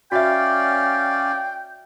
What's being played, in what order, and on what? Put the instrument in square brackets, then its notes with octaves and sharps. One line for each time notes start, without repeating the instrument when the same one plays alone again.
[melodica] C#4 D5 F5 [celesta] F#4 E5 [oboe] G5